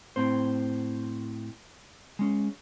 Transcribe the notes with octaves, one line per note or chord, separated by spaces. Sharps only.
A2 C4 C5
G#3 C#4